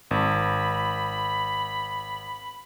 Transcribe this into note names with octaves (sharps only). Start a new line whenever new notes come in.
G#1 B5